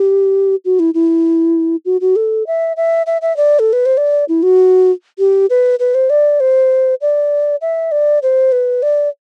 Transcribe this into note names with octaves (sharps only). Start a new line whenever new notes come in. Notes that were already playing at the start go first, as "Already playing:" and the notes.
Already playing: G4
F#4
E4
E4
F#4
F#4
A4
E5
E5
E5
E5
D5
A4
B4
C5
D5
E4
F#4
G4
B4
B4
C5
D5
C5
D5
E5
D5
C5
B4
D5